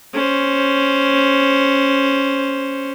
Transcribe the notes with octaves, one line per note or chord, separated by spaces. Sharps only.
C#4 C5